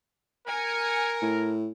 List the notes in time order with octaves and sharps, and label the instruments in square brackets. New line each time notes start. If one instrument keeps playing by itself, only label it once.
[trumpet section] A#4 [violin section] G#5 C#7
[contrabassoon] A2